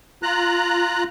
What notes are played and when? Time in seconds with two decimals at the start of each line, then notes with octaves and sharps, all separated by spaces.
0.23 F4 A#5 F#6